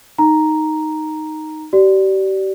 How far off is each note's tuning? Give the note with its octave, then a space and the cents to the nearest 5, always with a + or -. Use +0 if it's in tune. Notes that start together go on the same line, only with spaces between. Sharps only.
D#4 +0 A#5 +0
G4 -35 D5 +0